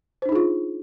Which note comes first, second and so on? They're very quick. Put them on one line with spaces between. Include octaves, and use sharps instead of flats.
C5 D4 D#4 G#4 F4